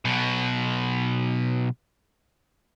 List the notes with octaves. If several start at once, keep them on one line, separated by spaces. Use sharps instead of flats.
B1 B2